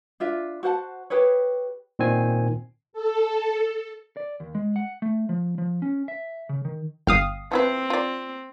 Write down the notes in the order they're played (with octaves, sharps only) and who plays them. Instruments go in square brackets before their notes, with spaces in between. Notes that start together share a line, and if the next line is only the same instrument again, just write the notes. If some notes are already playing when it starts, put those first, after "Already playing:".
[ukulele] D4 F4 E5
F#4 C5 F#5 A5
G4 G#4 B4 C#5
[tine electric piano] A#2 D#3 C4 G#5
[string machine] A4
[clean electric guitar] D5
D#2
G#3
F#5
A3
F3
F3
C#4
E5
C#3
D#3
[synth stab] G1 F5 D#6 [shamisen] G5
[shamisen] F3 E4 B4 [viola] C4
[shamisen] F4 D5